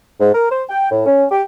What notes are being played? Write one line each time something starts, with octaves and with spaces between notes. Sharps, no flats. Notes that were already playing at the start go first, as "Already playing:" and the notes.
G#2
A#4
C5
G5
A2
C#4
G4